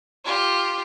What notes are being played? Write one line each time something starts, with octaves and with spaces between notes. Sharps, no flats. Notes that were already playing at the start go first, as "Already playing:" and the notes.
F4 G4